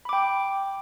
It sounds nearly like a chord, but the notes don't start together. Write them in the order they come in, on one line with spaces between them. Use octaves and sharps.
B5 D6 G5